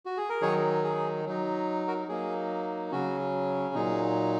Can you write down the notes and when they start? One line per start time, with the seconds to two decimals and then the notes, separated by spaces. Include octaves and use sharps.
0.06 F#4
0.17 G#4
0.30 A#4
0.41 D#3 F#3 D#4 G#4 C#5
0.84 G#4
1.26 F#3 D#4
1.87 F#4 A#4
2.08 F#3 A#3 D#4 G#4
2.92 C#3 F#3 C#4 F#4
3.75 A#2 F#3 D#4 G#4